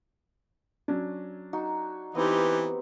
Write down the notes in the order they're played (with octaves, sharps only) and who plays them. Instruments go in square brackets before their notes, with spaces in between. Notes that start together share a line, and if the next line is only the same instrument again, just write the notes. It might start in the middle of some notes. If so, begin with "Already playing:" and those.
[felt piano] F#3 C#4 D4
[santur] D#4 F#4
[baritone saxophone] E3 [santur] B3 C4 [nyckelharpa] D#4 G4